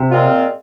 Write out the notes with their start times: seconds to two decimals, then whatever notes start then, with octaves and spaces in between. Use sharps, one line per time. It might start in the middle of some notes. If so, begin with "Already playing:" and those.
Already playing: C3
0.11 A#2 G#3 C4 F4